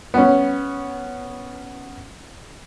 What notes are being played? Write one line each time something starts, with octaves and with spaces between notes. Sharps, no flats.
B3 C#4